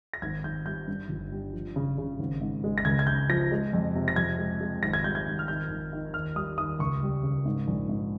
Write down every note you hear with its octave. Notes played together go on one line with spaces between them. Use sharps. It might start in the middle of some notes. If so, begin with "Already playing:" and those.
A#6
G#1 G#6
G#1 G6
G3 G6
G2
G1
G3
F3
C#3
C#3
G#1
G#2
G#3
A#6
C#2 G#6
G#6
C#3 G6
F3 A#6
G#3
F2
C3
A#6
F2 G#6
G#3
G#3
G#1 A#6
G#6
G3 G6
G#6
G#1
F6
D#3 G6
G#1
D#3
D#2 F6
G3 D#6
D#2 D#6
C#2 C#6
G3
C#3
G#2
A#1
G#2